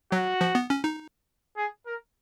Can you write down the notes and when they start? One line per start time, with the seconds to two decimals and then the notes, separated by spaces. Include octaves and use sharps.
0.11 F#3 F#4
0.41 F3
0.55 B3
0.70 C#4
0.84 D#4
1.57 G#4
1.86 A#4